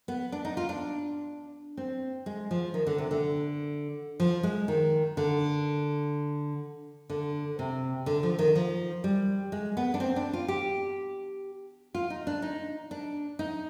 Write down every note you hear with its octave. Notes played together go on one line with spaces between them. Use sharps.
B3
D4
D#4
F4
D4
C4
G#3
F3
D#3
D3
C3
D3
F3
G#3
D#3
D3
D3
C3
D3
F3
D#3
F3
G3
G#3
B3
D4
C4
D4
F4
G4
F4
D#4
D4
D#4
D4
D#4